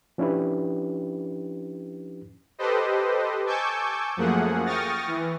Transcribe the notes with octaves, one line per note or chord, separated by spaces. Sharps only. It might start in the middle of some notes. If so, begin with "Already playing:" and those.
F3 C#4 D4 E4 G4 B4
G4 A4 B4 C5 D#5
G#5 A5 C#6 D6 E6 G6
F#2 F3 A3 A#3 G#4 F#5
G5 C#6 D#6 F6 A6 A#6
E3